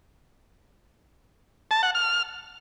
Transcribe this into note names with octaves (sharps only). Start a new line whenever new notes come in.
A5
F#5
F6